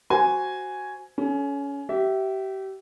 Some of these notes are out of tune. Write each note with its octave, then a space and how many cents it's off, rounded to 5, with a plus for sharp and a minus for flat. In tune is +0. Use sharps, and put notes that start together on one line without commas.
F#4 +10 C5 +0 G#5 +0
C#4 +20 A4 -30
G4 -30 E5 +0